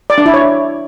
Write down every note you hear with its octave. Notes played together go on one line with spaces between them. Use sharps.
D5
D4
E4
C#5